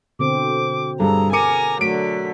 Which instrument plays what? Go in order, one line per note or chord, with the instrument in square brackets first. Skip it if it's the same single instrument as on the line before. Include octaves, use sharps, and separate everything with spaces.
[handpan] B2 D3 C4 [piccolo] D6
[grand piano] G2 [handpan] G#4 A4 [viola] A#5
[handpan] A#4 [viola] G#5 [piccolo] A#5 [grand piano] D6 C#7 D#7
[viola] D3 F#3 [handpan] A3 [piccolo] B6 [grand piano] D7